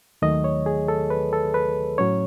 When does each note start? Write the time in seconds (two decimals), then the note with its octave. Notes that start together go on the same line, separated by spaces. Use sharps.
0.22 D#2 D#3 F#3 A3 D#5
0.44 C#5
0.66 G#4
0.88 A4
1.10 B4
1.33 A4
1.54 B4
1.98 A2 F#3 C#4 C#5